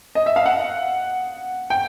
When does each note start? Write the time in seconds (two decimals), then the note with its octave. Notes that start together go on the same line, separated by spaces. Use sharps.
0.15 D#5
0.26 E5
0.36 F5
0.46 F#5
1.70 G5